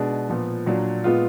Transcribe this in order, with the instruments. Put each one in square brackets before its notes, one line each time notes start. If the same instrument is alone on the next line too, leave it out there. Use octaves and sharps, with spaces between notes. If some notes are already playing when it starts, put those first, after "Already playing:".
Already playing: [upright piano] B2 G#3 D4 G#4
A#2 F3 B3
A#2 F#3 D4
A#2 G#3 B3 F4